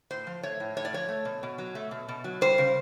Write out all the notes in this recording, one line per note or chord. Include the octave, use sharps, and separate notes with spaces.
A2 C5
F3
A3 C#5
A2
A2 C#5
D5
F3 C#5
A3
B2
B2
F#3
A3
B2
B2
F#3
G3 C5
C#3